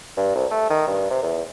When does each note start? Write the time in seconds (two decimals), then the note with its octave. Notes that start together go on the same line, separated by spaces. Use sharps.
0.17 G2
0.35 C2
0.51 A3
0.70 D#3
0.87 G2
1.10 C3
1.23 E2